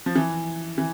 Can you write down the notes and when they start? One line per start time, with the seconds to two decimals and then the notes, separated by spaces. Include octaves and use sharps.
0.06 F3
0.16 E3
0.78 E3